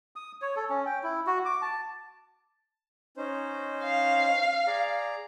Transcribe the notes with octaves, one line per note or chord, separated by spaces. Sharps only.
D#6
C#5
A4
C#4
G5
E4
F#4
D6
A5
C#4 D#4 C5
F5
G#4 D5 A#5